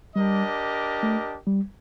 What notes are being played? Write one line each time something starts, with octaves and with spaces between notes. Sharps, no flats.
G3 D4 G4 A#4 D#5
A3
G3